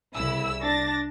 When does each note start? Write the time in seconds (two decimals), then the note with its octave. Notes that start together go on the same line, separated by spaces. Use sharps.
0.15 C2 C#3 E4 E6
0.62 D4 A6 A#6